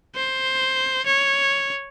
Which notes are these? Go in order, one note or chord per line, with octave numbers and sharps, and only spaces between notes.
C5
C#5